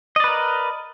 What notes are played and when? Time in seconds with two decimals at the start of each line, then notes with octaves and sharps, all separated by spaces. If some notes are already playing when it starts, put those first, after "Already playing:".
0.16 D#5
0.20 D5
0.24 B4
0.28 A#4